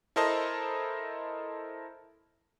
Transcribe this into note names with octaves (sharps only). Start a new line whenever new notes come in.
E4 A4 A#4 C5 D#5 A5